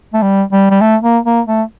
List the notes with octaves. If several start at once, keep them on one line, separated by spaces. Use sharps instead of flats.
A3
G3
G3
G3
A3
A#3
A#3
A3